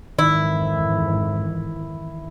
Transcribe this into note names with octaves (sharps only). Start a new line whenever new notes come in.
F2 G#2 D#3 E3 E4